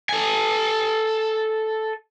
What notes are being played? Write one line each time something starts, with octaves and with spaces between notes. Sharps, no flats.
A4 G#5